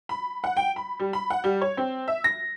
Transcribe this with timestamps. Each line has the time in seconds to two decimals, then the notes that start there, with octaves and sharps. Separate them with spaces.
0.09 B5
0.44 F#5
0.57 G5
0.76 B5
1.00 G3
1.13 B5
1.30 F#5
1.44 G3
1.61 C#5
1.77 C4
2.08 E5
2.24 A#6